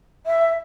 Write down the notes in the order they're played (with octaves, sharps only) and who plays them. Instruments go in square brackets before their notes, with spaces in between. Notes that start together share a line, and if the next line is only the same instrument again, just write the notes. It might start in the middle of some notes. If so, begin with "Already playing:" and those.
[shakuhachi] E5